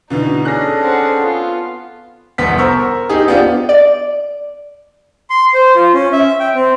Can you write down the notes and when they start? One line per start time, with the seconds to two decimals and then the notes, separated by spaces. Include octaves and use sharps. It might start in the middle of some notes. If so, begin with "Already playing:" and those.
0.10 B2 D3 E3 D#4
0.45 C#4 D4 G#4 A4 F#6 A#6
0.81 C4 F#5
1.20 B3 F4
2.38 F1 C2 B3 B6
2.58 A#4 C5 C#6 E6
3.09 D#4 G4 G#4
3.28 B3 C4 D4 F4 G4
3.69 D5
5.30 C6
5.54 C5
5.76 F4
5.94 C#4
6.12 E5
6.40 G5
6.55 C4